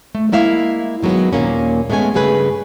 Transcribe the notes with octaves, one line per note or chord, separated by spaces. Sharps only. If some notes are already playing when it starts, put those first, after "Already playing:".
A3
G#3 A#3 E4 E5 F5
D#3 F#3 G#3 B3
D#2 A#2 A#3 C#4
G#3 A3 B3 C#4 G#5
G2 C#3 A3 G#4 B4 G#5